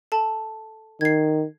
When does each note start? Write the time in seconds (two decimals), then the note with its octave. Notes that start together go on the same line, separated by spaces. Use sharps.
0.12 A4 A5
1.01 D#3 G#6 C7